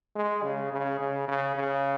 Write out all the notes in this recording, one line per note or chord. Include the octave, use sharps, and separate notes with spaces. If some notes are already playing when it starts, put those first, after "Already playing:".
G#3
C#3
C#3
C#3
C#3
C#3